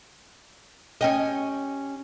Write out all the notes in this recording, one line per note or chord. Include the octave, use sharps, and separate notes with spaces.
C#4 G4 D#5